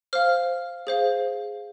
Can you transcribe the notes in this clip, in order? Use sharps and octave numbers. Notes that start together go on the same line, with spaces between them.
C5 F5 F6
G#4 C5 F5